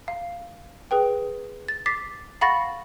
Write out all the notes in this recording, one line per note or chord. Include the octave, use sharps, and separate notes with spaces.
F5
G#4 B4 G5
A6
D6 A6 B6 C7
F5 F#5 B5 C#6 A6 A#6